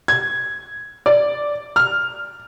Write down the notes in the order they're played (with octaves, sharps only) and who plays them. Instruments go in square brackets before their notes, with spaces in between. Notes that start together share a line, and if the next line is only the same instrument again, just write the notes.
[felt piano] G#6
D5
F6